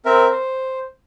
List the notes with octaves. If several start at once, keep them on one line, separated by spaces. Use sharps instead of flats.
C4 A#4 E5
C5